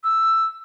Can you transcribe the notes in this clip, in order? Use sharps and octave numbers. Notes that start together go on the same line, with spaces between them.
E6